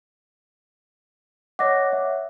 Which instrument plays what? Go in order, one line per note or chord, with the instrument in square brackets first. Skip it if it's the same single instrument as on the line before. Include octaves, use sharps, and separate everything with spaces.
[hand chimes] C#5 D#5 F#5 [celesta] D6 A#6
[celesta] E5